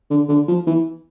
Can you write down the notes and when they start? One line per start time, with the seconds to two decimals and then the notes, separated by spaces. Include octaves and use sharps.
0.10 D3
0.29 D3
0.48 F3
0.67 E3